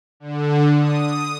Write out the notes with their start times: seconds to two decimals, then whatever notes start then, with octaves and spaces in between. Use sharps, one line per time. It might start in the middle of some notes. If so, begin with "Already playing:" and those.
0.20 D3
0.78 D#6